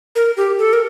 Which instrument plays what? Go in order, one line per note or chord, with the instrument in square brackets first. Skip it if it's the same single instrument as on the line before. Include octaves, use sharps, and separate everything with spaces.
[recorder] A#4
G4
A4
A#4